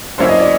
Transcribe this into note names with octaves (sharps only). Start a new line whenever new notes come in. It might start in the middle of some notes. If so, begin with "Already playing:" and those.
D3 F#3 A#3 C#4 E4 C5
D#5
D5